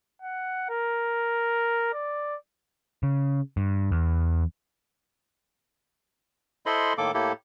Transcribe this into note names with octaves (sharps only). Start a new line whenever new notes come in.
F#5
A#4
D5
C#3
G2
E2
E4 A4 C5 D#5 B5 C6
A2 D#3 A#3 A4 D6
A2 A#3 E4 G4 A4